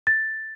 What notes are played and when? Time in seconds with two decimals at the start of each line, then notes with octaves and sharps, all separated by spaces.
0.07 A6